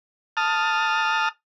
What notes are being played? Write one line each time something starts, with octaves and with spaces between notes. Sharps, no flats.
A5 D#6 F6